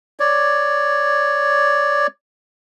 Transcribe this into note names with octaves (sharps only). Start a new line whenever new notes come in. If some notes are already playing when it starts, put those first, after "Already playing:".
C#5 D5